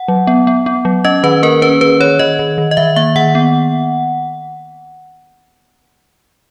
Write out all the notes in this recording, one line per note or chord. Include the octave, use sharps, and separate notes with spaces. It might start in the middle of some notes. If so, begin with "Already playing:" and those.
Already playing: F#5
F#3
B3
B3
B3
F#3
C#4 D#5
D#3 B4
A#3 A#4
C#4 B4
D#3 B4
D#3 C#5
D#3 D#5
D#3
D#3
D#5
D#3 E5
A#3 E5
D#3 F#5
B3